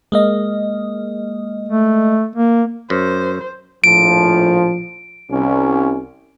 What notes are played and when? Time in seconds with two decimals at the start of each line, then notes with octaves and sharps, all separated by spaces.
0.12 G#3 A#3 D#5
1.69 A3
2.35 A#3
2.90 F#2 C5
3.84 A#1 A2 F3 D7
5.30 C2 C#4